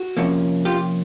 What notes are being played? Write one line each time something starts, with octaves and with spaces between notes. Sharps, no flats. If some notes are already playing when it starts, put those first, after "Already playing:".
Already playing: F#4
C3 F3 A#3 C#4
F4 G4